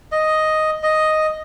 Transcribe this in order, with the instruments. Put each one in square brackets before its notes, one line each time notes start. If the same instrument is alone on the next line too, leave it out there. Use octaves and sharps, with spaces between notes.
[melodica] D#5
D#5